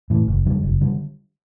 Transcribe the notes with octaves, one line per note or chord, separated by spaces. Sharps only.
A2 E3
F#1
F2 D3 G3
F#1
D3 G3